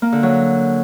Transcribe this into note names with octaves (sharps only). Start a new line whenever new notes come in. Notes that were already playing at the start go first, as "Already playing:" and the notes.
A#3
D3
F#3